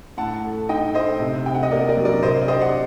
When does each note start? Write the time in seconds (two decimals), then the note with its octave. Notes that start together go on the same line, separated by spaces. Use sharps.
0.17 A2 F#5 A5
0.44 A4
0.69 D#4 D#5 G5
0.94 A3 C5 D#5
1.20 C3
1.46 C3 G5
1.54 F#5
1.63 D#5
1.71 A#3 A#4 D5
1.89 A#4 D5
1.97 F#3
2.05 A#4 D5
2.22 C3 C5 D#5
2.42 D5
2.48 G4 C5 D#5
2.61 D5 F#5